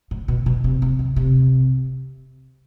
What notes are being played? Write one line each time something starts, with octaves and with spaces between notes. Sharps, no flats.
A2
B2
B2
C3
C3
D#3
C3